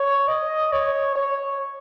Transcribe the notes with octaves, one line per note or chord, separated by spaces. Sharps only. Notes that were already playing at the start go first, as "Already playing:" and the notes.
Already playing: C#5
D#5
C#5
C#5